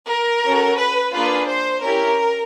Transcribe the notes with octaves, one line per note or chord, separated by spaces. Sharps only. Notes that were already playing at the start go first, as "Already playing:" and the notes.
A#4
C#4 F#4 A4
B4
A#3 D4 F4 G#4 B4
C5
C#4 E4 G4 A#4